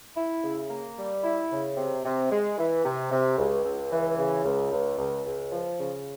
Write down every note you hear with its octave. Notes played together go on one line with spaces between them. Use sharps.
E4
C#3
A#3
G3
E4
C#3
C3
C3
G#3
E3
C3
C3
C#2
C#2
E3
C#3
C#2
C#2
C#2
C#2
F3
C#3